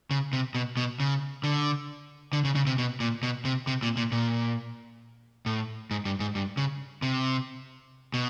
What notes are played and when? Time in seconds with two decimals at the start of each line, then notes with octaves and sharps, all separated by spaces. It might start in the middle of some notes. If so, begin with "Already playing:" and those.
0.11 C#3
0.33 C3
0.55 B2
0.77 B2
1.00 C#3
1.44 D3
2.33 D3
2.45 C#3
2.55 C#3
2.67 C3
2.78 B2
3.00 A#2
3.23 B2
3.45 C3
3.67 C3
3.83 A#2
3.97 A#2
4.12 A#2
5.46 A2
5.91 G#2
6.05 G2
6.20 G#2
6.35 G2
6.57 C#3
7.02 C3
8.14 B2